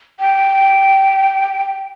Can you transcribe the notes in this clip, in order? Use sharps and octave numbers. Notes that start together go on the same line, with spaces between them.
G5